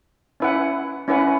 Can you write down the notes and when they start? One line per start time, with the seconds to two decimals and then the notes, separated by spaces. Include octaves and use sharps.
0.40 C#4 E4 B4 F#5
1.08 C#4 E4 B4 F#5